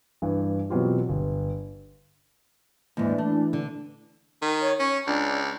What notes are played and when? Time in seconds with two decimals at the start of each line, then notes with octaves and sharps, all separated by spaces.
0.22 G2 E3
0.70 B2 E3 F#3 C4 F4 G4
1.09 G1
2.97 D#2 G#2 E3 D4
3.18 A3
3.53 D3
4.42 D#3
4.61 C#5
4.79 C#4 C#6
5.07 C#2 D4